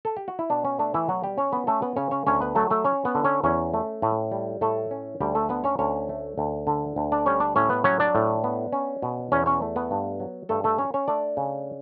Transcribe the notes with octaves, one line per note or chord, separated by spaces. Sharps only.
A4
G4
F#4
E4
B2 D4
C#4
A3 D4
E3 E4
B2 F#3 F#4
G3 G4
C#4 C#5
B3 B4
A3 C#4 A4
B3 B4
C#3 C#4 C#5
C#4 C#5
D2 C#4 C#5
B3 B4
F#3 A3 A4
A3 A4
C#4 C#5
B3 B4
D3
C#4 C#5
E2 C#4 C#5
A3
A2
G3
A2 A3 A4
C#4
D2 G3 G4
A3 A4
D3 B3 B4
C#4 C#5
D2 C#4 C#5
A3
D2
D3
D2
D4 D5
G3 C#4 C#5
D4 D5
A2 C#4 C#5
B3 B4
F#3 C#4 C#5
D4 D5
A2
B3
C#4
B2
E2 C#4 C#5
C#4 C#5
A3
B3 B4
G2
F#3
G2 A3 A4
A3 A4
C#4 C#5
C#4 C#5
A3 D4 D5
C#3